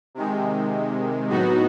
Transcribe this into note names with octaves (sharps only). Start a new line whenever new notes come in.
C3 D#3 G#3
A2 F#3 B3 D#4 F#4